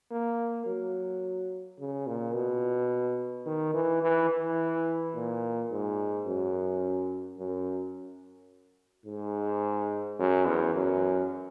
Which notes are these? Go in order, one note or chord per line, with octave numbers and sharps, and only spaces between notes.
A#3
F#3
C#3
A#2
B2
D#3
E3
E3
E3
A#2
G#2
F#2
F#2
G#2
F#2
E2
F#2